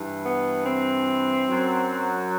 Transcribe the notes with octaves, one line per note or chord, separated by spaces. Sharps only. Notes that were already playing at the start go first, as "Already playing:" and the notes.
Already playing: G2 E3
B3
C4
F#2 F#3